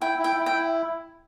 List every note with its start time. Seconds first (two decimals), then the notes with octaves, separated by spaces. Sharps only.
0.01 E4 G5
0.18 E4
0.24 G5
0.36 E4
0.46 G5
0.52 E4